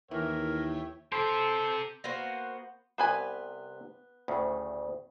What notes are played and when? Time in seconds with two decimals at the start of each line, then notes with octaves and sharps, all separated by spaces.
0.11 D#2 E3 A#4 C#5 E5 G5
1.12 C4 G4 A4 C5
2.04 A#3 B3 F#4 C5
2.98 C2 C3 B3 B4 C5 G#5
4.28 D2 A2 C#3